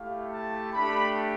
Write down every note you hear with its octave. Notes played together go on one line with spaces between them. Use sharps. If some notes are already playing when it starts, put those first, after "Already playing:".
Already playing: A3 E4 G4 F5
A5
A3 D4 G4 B5